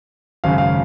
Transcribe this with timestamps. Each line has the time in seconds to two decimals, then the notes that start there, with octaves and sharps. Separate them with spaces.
0.44 G#1 F#2 C#3 F5
0.58 F5